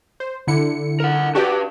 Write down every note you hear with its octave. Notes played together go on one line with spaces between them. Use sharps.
C5
D3 E4 C#7
A#4 F#5
D4 F#4 G4 B4 D5